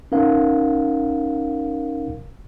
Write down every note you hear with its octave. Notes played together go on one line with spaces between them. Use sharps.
C#4 D#4 A#4 F5 F#5